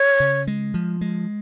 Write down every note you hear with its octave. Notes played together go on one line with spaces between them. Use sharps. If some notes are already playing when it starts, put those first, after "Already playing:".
Already playing: C#5
C#3
G#3
F3
G#3